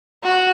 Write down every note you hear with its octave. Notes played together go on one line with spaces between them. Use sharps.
F#4